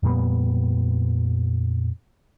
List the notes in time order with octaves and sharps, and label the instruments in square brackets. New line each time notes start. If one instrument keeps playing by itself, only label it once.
[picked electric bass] F2 A#2 G3 B3